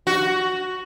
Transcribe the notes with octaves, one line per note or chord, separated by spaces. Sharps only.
F#4